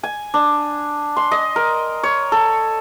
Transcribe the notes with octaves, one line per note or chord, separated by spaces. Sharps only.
G#5
D4
C6
D#5
A#4
C#5
A4